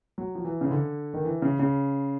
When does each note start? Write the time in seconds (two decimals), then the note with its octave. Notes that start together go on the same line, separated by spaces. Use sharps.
0.18 F#3
0.35 F3
0.45 E3
0.61 C#3
0.71 D3
1.14 D#3
1.25 E3
1.42 C#3
1.59 C#3